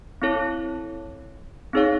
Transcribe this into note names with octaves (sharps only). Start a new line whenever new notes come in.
C4 E4 A4 C#5
C4 D#4 G#4 C#5 F5